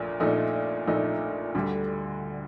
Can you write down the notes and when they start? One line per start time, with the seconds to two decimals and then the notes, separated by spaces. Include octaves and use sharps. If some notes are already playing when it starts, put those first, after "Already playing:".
Already playing: A#1 A#2 A3
0.20 A#1 A#2 A3 D#4
0.87 A#1 A#2 A3 D#4
1.55 D2 D3 G3